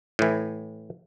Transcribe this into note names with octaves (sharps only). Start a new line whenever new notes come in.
A2 E3